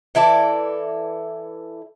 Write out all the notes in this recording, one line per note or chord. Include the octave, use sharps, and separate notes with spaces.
E3 E4 A4 D5